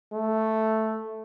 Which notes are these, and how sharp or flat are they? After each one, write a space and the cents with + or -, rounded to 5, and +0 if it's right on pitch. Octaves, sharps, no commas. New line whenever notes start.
A3 +0